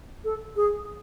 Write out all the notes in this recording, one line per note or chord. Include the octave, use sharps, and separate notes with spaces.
A4
G#4